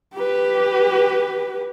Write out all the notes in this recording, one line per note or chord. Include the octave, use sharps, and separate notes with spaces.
G4 B4